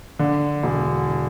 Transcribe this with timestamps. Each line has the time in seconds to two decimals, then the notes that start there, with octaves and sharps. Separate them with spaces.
0.19 D3
0.63 E1